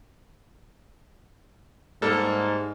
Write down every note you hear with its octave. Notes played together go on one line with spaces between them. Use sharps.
G#2 G3 A#3 A4